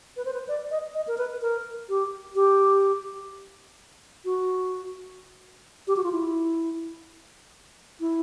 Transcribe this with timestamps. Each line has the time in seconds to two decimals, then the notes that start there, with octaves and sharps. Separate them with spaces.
0.17 B4
0.25 C5
0.34 B4
0.48 D5
0.71 D#5
0.95 D#5
1.07 A#4
1.18 B4
1.41 A#4
1.89 G4
2.36 G4
4.25 F#4
5.88 G4
5.96 F#4
6.04 F4
6.12 E4
8.00 E4